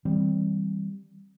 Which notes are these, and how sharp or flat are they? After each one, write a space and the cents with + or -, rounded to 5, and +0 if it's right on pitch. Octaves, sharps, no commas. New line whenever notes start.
E3 -35 G3 +0 C4 +5